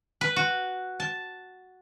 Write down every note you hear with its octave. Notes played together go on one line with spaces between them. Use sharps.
B4
F#4
A5